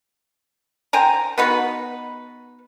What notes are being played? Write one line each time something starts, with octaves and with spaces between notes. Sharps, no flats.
C5 G5 G#5 A#5
B3 D#4 F#4 B4